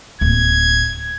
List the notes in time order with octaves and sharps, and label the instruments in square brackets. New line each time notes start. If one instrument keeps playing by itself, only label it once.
[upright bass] D1 A#3 [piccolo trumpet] G#6